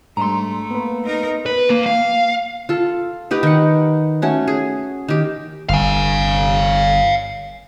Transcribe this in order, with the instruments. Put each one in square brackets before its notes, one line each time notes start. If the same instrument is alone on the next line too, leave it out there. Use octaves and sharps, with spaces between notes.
[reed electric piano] G#2 D4 [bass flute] G3 [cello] A3 [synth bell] A#5 C6
[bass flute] A#3 [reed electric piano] B3 B4
[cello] D#4 A#4
[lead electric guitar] B4
A#3
F5
[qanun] F4 A4
D#4 G4 B4
D#3 F#5
A3 C#4 F#4
G#4
D#3 G4
[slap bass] G1 [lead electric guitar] F5 G#5